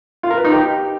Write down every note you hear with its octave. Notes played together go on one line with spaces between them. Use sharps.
F4
A#4
B4
D#4
G4